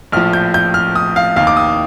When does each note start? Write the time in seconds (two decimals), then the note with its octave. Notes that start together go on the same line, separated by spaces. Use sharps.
0.12 A#1 A2 F3 F6
0.33 G6
0.54 G6
0.74 F6
0.95 D#6
1.16 F5
1.36 D#2 D#3 F5
1.47 D6
1.57 D#6